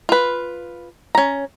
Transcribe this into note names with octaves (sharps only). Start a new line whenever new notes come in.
F4 B4
C#4 A#5